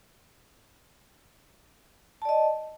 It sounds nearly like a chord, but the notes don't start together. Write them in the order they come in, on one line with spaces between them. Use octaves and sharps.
A5 D5 D#5